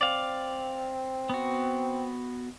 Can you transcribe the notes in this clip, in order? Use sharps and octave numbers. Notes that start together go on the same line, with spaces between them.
C4 D5 F5
B3 F#4